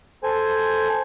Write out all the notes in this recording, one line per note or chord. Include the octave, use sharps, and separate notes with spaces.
A4 C5 G#5